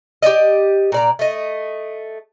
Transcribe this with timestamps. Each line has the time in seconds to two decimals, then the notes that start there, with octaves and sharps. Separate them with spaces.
0.22 G4 G#4 D5 D#5
0.92 A#2 D5 A#5
1.19 A3 D#5